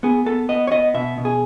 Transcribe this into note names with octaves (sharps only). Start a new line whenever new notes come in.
B3 G#4
B3 A4
B3 D#5
C#5
B3 D#5
B2 E5
B2
G#4